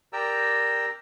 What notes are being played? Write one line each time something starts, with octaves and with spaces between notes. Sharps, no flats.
G4 A#4 D5 G5 A#5 E6